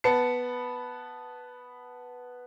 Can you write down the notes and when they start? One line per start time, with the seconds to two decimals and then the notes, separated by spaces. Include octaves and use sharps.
0.04 B3 B4 A5 C#7